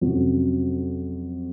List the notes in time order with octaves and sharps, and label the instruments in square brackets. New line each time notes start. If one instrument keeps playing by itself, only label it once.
[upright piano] F2 C3 F#3 C#4 F#4